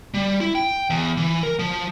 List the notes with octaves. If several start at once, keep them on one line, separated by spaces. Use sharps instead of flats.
G3
E4
G5
E2
E3
A#4
F3